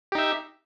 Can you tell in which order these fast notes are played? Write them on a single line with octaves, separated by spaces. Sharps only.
G4 D#4 E5